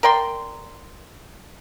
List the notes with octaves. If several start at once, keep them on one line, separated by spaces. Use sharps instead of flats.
A#4 D5 G5 C6